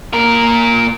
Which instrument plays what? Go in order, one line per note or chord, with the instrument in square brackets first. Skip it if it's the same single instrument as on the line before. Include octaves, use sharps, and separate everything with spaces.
[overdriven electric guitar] A#2 A#4